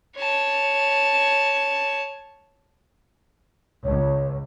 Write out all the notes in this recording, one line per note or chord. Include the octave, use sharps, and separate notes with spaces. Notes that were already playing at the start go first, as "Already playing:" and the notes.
C#5 A5
C#2 C#5